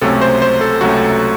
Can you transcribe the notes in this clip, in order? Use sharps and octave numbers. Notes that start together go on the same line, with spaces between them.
C#2 C3 F#3 A3 C#4 A4
C5
C5
A4
C#2 C3 F#3 A3 C#4 F#4